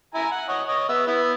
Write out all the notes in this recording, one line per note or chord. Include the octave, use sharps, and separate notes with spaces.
E4 G#5 A#5
F#5
C#5 D#5 F#5
C#5 D#5
B3 E5
B3 E4